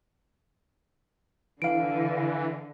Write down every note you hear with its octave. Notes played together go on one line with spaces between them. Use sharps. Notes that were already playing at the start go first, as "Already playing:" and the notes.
D3 E3 F5 D7